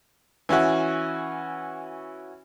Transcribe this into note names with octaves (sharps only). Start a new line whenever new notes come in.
E3 C#4 E4 F#4